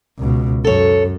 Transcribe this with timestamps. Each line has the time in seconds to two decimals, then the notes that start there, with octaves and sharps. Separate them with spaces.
0.18 C#2 B2
0.64 F#2 A4 C#5